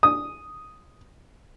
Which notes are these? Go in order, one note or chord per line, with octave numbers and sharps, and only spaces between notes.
D#6